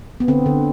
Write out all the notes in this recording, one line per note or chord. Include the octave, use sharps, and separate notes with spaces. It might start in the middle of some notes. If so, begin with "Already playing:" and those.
B3
D3 C4
D3